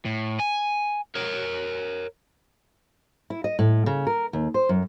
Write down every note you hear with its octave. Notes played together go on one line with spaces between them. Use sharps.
A2
G#5
A#4 C#5
E4
D#5
A2
C#3
A#4
D#2
C5
F#2